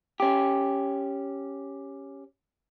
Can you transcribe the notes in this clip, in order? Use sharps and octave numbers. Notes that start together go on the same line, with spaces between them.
C#4 G4